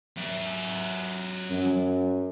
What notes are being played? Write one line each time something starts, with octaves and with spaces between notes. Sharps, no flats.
F#3 E5
F#2